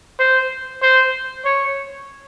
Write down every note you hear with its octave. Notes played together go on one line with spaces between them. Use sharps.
C5
C5
C#5